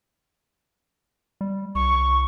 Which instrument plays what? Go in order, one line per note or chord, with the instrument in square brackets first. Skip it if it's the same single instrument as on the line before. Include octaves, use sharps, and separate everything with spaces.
[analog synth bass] G3
[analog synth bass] C2 [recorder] C#6